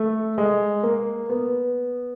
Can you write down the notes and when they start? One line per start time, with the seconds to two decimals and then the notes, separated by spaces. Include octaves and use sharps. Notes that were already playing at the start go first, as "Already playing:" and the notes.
Already playing: A3
0.38 G#3
0.83 A#3
1.29 B3